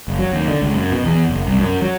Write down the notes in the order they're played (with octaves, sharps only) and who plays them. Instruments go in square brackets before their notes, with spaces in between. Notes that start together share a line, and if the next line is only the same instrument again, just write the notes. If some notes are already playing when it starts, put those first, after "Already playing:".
[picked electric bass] F#1
F#3
D#2
D3
C#2
F#2
B2
E2
F#1
C2
F#2
F#3